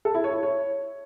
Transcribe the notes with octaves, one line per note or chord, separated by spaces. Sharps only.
A4
E4
C#5
E4
C#5